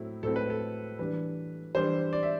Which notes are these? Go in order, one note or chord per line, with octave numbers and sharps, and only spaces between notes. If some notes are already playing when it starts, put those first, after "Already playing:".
Already playing: A2 F#3 A3 C4 E4
A2 F#3 A3 C4 E4 A4
B4
A4
E3 G3 D4 B4
E3 G3 D4 C5
D5
E5